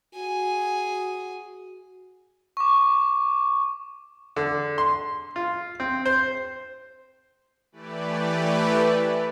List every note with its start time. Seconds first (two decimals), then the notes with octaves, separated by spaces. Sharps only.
0.15 F#4 G#4 G#5
2.57 C#6 D6
4.36 D3
4.78 C6
5.36 F4
5.80 C4
6.06 C5
7.72 E3 A3 E4 G4 B4 D5